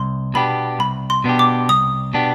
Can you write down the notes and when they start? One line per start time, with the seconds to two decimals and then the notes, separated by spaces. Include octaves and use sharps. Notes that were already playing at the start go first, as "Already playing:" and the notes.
Already playing: C2 C6
0.34 B2 B3 D4 G4 B5
0.79 C2 B5
1.10 C6
1.24 B2 B3 D4 G4
1.39 D6
1.69 C2 D#6
2.14 B2 B3 D4 G4